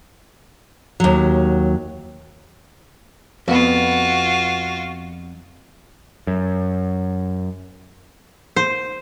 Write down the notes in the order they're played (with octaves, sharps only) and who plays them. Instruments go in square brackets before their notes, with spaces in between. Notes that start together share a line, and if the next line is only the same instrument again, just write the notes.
[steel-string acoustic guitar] D#2 F#3
[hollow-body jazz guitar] F2 B3 [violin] F4 F#4
[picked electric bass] F#2
[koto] C5